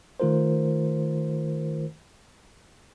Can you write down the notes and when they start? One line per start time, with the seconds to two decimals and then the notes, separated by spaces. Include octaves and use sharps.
0.20 D#3 A3 F4 A#4 C5